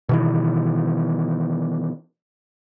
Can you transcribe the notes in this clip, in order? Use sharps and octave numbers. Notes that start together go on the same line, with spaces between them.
B2 D#3 E3